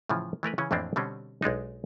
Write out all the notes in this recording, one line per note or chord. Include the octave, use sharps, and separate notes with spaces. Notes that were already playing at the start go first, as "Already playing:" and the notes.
A2 C#3 E3 F3
E3 A3 A#4 B4
C#3 E3 C#4
F2 A2 E3 A#3 C4 D4
B2 D3 G3 C4 C#4
B1 G#3 D4 D#4